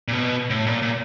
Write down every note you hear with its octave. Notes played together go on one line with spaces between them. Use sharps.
A#2
B2
A2
A#2
A#2